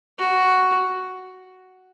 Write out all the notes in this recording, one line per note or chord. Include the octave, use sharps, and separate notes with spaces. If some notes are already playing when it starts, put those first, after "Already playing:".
F#4